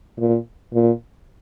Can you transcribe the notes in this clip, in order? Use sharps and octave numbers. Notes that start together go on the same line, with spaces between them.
A#2
A#2